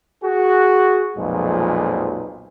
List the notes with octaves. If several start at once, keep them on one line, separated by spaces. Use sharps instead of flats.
F#4 G#4
B1 F2 A#2 F3 G#3